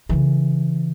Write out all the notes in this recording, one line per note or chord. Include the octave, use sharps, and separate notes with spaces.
C#3 E3